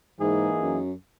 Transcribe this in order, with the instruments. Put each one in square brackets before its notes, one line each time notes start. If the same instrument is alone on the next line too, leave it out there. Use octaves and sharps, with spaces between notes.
[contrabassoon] G#2 [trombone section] E3 A#3 D#4 G#4
[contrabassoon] F#2